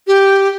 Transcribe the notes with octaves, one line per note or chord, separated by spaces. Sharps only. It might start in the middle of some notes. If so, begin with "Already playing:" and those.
G4